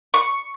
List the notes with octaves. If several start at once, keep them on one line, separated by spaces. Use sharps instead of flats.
C#6